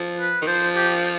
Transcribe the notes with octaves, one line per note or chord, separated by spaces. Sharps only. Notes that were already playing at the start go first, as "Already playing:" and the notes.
Already playing: F3
B4
D#3
F3 C5
G4